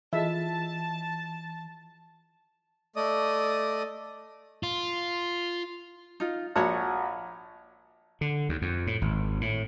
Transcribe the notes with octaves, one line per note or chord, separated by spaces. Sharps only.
E3 F4 G#4 D#5 E5 A5
A3 D5 D#5 D#6
F4
D#4 F4
A#1 F#4 C#5 F#5
D3
D#2
F2
A2
G#1
A2